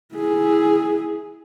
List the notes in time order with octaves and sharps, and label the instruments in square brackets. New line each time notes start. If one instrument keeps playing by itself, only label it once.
[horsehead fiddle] E4 G#4